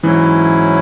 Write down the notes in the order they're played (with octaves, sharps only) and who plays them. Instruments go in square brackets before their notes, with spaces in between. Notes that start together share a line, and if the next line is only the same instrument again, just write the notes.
[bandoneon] G#2 F#3 C#4 E4 [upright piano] E3